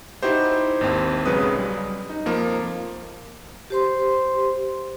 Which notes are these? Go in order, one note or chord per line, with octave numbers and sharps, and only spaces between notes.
D#4 E4 F#4 G4 C5
G#1 D#2 C4
B1 C#3 F#3 G#3 B4 D#6
G3
D#4
F2 F3 A#3
G4 C5 C6